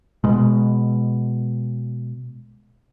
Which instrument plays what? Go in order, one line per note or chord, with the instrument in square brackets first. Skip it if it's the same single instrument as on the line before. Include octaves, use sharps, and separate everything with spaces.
[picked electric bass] B2 G#3